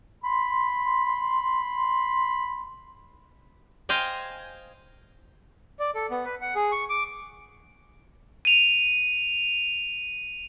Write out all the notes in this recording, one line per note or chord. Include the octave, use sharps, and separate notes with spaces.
B5 C6
C5 D#5 F5 G5 G#5
D5
A4
B3
B4
F#5
G#4
C#6
D6
D#7 F7